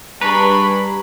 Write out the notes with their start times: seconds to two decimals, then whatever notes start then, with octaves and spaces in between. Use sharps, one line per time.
0.21 G3 D4 G#4 B4 A#5 B5 C#6